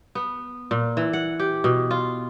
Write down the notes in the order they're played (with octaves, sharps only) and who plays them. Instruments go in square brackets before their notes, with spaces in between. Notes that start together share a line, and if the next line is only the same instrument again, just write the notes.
[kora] B3
A#2
E3
F#5
G4
B2
F4